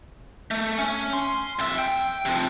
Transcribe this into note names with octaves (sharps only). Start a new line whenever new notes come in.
A3
C#4
C6
F2 E5
G5
C3 F3